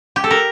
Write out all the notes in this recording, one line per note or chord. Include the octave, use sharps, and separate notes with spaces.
G4
A4
A#4